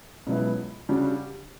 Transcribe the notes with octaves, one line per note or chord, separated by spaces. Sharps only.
C#2 B2 F#3 B3 E4
C#3 G3 D4 F#4